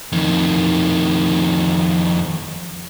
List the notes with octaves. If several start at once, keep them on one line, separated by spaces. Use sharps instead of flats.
F2 D#3